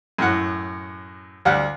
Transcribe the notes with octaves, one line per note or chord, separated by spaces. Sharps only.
F#2 A2 F#5
D2 G3 F5 F#5